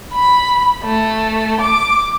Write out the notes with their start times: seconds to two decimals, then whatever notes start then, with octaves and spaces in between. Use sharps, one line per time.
0.13 B5
0.84 A3
1.61 D6